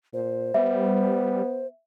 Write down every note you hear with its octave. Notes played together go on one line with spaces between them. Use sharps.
A#2 C5
G3 B3 E5